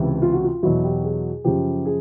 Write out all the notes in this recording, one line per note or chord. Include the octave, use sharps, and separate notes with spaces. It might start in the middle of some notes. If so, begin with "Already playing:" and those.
Already playing: C#2 C3 E3
F4
F#4
F4
E2 B2 F#3 E4
G4
G#4
F#2 C#3 F3 G4
G#4